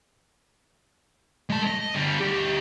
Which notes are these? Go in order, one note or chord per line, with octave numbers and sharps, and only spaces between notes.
G#3 A5
D#5
D3 G3
D2 G4